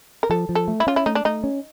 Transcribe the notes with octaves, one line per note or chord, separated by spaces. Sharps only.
A#4
F3 A4
F3
A4
A3
E4
C#4 F4
E4
A3 D#4
D4
A3 D#4
C#4